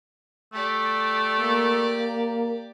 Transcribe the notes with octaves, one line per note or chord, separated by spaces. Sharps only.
A3 G4 D5
A#3